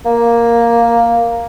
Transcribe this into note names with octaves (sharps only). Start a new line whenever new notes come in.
A#3